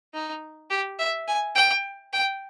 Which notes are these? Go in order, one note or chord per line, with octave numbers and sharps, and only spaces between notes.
D#4
G4
E5
G#5
G5
G5